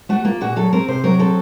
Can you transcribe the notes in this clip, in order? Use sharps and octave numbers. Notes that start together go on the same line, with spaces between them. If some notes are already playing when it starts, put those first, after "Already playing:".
A3 F#4
A#3 F4
A#2 F#4
F#3 A4
C4 A#4
C3 C5
F#3 A#4
C4 A4